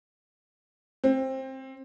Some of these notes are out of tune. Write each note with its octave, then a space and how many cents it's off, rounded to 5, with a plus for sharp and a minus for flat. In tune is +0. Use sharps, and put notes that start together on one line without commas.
C4 +15